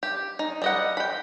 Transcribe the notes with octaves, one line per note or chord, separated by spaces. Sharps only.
G4
D#4
G3 D#5 F#5
G5 B5